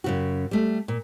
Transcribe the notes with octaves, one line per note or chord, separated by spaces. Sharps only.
F#2 C#3 F#4
G3 A3
A#2